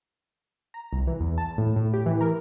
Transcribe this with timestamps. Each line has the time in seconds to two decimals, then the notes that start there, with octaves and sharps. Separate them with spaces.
0.74 A#5
0.93 C2
1.07 E3
1.20 E2
1.38 A5
1.58 A2
1.76 A2
1.94 G4
2.06 E3
2.21 A#4